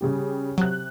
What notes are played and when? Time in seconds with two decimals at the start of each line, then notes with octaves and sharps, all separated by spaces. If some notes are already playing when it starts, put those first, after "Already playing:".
0.01 C#3 G3 G4
0.58 C3 F#3 F#6